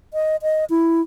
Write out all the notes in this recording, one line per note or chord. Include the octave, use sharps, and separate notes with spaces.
D#5
D#5
E4